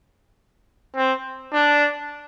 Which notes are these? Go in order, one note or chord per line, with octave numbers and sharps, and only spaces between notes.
C4
D4